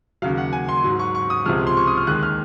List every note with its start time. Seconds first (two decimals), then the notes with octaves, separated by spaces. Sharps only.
0.22 D#2 C#3 F#3 F5
0.37 F#5
0.53 G#5
0.69 C6
0.84 G#2 F#3
0.99 C#6
1.15 C#6
1.30 D#6
1.45 C#2 C3 F3 G#3 F6
1.67 C6
1.77 C#6
1.87 D#6
1.97 F6
2.07 D#2 D#3 G#3 F#6
2.23 F6